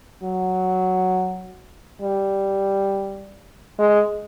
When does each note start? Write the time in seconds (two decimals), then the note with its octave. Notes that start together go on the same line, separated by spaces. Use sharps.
0.23 F#3
2.02 G3
3.79 G#3